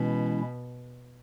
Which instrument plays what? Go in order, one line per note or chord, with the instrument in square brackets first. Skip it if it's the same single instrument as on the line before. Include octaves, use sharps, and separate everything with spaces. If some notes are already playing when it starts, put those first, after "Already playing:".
Already playing: [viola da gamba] B2 [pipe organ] E3 G#3 C#4 E4